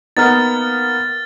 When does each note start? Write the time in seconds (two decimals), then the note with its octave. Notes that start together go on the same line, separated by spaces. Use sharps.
0.17 A#3 B3 D#4 F6 A6